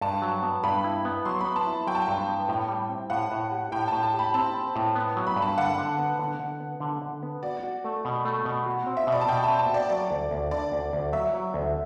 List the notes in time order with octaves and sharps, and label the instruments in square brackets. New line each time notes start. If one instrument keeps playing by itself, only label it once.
[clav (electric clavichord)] G2 [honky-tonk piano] A5
[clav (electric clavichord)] F#3
B3
[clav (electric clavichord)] G2 [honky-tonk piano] B5
[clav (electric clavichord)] E4
B3
[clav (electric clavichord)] F#3 [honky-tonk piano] C6
[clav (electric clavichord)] B3 [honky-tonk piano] B5
[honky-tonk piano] A5
[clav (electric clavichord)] E4
[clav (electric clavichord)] F#3 [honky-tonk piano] G5
[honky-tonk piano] A5
G5
[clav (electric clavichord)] G2
B3
A2
G3
C4
[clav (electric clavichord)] A2 [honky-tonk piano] F#5
[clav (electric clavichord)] A2
G4
[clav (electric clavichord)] A2 [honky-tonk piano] G5
[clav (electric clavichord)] A2 [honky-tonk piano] A5
[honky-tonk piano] A5
[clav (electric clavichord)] G4 [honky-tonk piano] B5
[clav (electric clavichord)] C4 [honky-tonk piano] A5
[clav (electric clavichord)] C4
A2
B3
F#3
[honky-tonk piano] B5
[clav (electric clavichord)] G2
[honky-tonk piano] A5
[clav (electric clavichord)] D3 [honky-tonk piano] F#5
[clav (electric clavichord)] D3
B3
D3
D3
B3
D3
D3
B3
[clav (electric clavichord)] F#4 [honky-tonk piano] D5
[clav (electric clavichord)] F#4
A3
B2
A3
B2
F#4
C4
[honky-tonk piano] E5
[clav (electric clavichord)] B2
[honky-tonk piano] D5
A5
[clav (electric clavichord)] B2 [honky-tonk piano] G5
[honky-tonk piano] A5
[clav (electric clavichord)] C4
[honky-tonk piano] A5
[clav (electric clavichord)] F#4 [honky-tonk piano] D5
[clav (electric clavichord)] F#3 [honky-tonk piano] D5
[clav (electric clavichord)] D2
D2
[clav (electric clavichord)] D3 [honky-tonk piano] D5
[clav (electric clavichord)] D2
D2
[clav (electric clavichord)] F#3 [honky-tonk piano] E5
[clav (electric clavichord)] F#3
D2